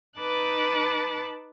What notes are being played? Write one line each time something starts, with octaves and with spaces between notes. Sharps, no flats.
D#4 B4 A5 D6 F#6 A6